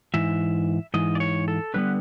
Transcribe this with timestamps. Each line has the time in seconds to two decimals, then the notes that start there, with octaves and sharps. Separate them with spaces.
0.14 G#2 E3 E5
0.94 G#2 E3 D#5
1.15 D5
1.20 C#5
1.48 A4
1.74 D3 G3 B3 B4